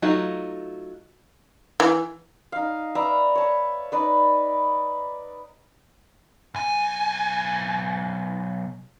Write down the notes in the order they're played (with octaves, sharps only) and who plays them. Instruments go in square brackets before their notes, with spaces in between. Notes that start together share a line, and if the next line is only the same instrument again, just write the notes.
[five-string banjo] F#3 A3 D#4 F4 F#4
[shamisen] E3
[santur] D#4 F5
B4 D5 E5 A#5
C#5 A5
D#4 B4 D5
[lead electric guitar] B1 G#5